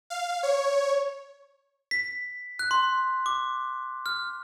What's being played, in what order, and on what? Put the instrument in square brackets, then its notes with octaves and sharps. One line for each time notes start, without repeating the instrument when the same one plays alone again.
[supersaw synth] F5
C#5
[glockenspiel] B6
F#6
C6
D6
F6